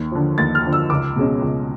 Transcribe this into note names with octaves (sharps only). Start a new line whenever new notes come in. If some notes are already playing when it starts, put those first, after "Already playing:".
Already playing: D#2
D3 F3
D#2 A6
F6
D3 F3
E6
C#2 D6
B2 G#3 C#4
C#2